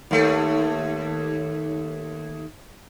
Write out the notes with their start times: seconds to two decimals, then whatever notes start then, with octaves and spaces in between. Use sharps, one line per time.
0.11 D#2 A3